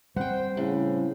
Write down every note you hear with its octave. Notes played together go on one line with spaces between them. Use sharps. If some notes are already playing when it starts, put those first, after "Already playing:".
G3 C4 C5 F#5 G5
A2 C#3